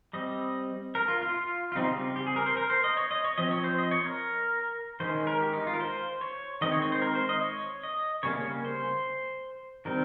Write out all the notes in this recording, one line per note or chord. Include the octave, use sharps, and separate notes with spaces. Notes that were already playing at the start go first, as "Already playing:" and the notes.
G3 C4 D#5
A#4
F4
F4
F4
F4
C#3 G3 C4 D#4
F4
G4
G#4
A#4
C5
A#4
C5
D#5
C#5
D#5
C#5
F3 C4 D#5
C#5
C5
D#5
C#5
A#4
D#3 G#3 C#4 C5
A#4
G4
D#4
F4
A#4
C5
C#5
D#3 G#3 C4 D#5
C#5
C#5
C5
A#4
C5
D#5
C#5
D#5
C#3 G3 A#3 C#4 C#5
C#5
C5
D#3 G3 C4 A#4